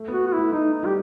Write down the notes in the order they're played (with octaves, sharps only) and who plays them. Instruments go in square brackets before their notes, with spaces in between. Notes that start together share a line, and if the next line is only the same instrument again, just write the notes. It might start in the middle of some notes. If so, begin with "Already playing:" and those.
Already playing: [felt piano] A3
[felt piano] B3 [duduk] F#4
[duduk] F#4
E4
[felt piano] A3
[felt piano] A3 [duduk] D#4
[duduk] D#4
[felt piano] G3 [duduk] G4